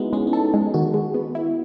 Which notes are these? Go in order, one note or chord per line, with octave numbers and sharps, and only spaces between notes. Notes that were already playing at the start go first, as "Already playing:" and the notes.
Already playing: G#3 B3 D#4 E4 F#4
G#3 C#4
C#4
D#4 A4
G#3
D#3 F#4
G#3
B3
E4